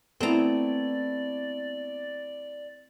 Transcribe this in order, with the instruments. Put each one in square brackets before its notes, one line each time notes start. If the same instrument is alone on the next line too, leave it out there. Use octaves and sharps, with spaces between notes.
[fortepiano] A3 E4 [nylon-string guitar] B3 [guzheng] C4 A#5 [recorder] D5